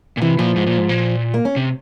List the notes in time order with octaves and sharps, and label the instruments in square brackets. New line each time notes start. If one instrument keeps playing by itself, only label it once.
[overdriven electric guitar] A#2
[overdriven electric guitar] C3 [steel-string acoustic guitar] E3
[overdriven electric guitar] A#2 [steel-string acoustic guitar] F3
[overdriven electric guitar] G#2
A#2
G#2
A#2
[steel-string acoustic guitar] A#3
C#4
[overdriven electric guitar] C3